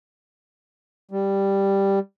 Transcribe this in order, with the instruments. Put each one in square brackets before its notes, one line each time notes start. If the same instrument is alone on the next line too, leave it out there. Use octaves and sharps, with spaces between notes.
[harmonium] G3